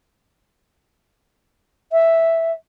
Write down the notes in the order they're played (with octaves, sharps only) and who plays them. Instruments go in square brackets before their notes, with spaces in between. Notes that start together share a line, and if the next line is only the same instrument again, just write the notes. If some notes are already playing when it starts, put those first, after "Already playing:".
[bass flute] E5